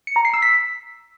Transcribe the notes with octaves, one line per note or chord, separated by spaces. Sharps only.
C#7
A#5
C7
E6
B6